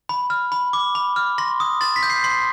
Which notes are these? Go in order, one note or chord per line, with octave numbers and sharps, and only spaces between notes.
B5
F6
B5
D6
B5
F6
C6 A#6
D#6
C6 A6
B6
G6
C7
C6 C7